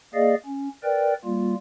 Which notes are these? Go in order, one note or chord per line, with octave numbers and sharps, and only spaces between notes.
A#3 G#4 D5 D#5 F5
C#4
A#4 B4 D5 G5
G3 A#3 F4